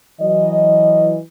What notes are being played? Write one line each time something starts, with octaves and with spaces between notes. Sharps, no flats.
E3 F#3 D#5